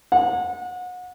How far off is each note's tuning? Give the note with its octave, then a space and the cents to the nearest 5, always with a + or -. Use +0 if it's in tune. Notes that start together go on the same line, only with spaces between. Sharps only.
F#5 -30